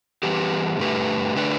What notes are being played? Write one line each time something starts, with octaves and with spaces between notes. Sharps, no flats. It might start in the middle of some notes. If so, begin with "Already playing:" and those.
E3 G3 B3 G4
G2 D3 A3 G4 B4
D3 A3 D4 B4 D5